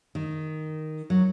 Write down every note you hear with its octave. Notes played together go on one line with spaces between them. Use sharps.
D#3
F#3